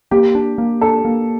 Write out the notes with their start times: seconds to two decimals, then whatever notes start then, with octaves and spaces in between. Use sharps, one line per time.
0.11 A#3 G4
0.35 D4
0.58 A#3
0.81 D4 A4
1.05 A#3